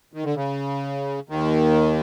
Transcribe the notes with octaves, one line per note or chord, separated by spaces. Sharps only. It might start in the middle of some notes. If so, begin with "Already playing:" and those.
D#3
D3
C#3
D#2 D#3